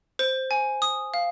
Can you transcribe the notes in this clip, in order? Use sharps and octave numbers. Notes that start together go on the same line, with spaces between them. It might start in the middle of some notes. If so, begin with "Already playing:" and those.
C5
G#5
D#6
F5